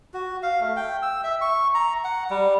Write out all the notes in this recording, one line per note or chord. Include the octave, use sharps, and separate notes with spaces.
F#4
F5
A3
G5
E6
E5
C#6
A#5
F#5
G3